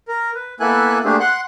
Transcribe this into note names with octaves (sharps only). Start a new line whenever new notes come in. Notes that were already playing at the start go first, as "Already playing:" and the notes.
A#4
B4
A#3 B3 E4 A4 G#5 F#6
A3 A#3 D4 G4 G#4 C5
F#5 C6 F#6